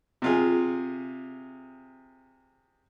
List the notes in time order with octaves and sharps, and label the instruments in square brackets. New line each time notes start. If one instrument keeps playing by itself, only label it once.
[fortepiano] C3 F4 G#4